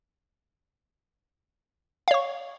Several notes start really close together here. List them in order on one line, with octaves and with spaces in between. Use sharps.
F5 C#5 C#6